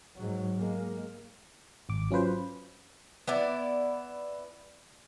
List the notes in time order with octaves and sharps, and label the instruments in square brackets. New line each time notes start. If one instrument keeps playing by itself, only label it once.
[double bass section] G#2 F#3
G#3 A#3
[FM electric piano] G#1 D6
F#3 C#4 F4 B4 C5
[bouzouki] B3 E4 D5